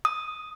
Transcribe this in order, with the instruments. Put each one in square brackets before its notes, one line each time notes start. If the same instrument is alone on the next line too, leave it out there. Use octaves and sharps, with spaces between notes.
[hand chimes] D#6